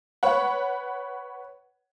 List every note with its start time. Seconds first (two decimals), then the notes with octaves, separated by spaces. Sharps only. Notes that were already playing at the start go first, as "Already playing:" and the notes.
0.23 B4 C#5 F#5